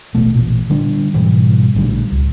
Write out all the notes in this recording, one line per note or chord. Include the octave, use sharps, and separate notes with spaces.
D#1 A1 B2 A3
A1 A#2
D3 G3 D4
G#2 B2 E3 G3
A#1 A2 D3 G3
C#2